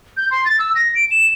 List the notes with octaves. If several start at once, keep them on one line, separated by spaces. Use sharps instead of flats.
G6
C6
A6
E6
A#6
D7
E7